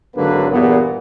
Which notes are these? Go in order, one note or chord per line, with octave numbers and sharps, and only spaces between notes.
G#1 D3 F#3 A#3 D4 B4
E2 G2 A#2 E3 B3